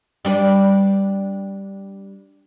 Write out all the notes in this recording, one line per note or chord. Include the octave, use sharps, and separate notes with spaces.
G3 D4 B4